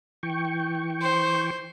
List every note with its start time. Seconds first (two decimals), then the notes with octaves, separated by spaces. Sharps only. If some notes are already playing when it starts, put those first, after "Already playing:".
0.23 E3 G5 C#6
1.01 C5